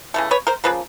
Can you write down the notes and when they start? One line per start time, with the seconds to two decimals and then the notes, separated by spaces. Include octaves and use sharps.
0.14 C#3 E3 A3
0.31 B4 C#5
0.47 A#4 C5
0.64 C#3 F3 A#3 B4